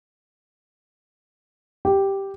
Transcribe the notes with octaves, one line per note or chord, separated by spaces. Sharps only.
G4